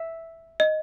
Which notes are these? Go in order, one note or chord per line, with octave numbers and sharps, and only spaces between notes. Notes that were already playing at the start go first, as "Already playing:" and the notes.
Already playing: E5
D#5